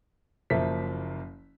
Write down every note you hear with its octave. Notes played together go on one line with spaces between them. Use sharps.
F#1 F3 A#3 E5 B6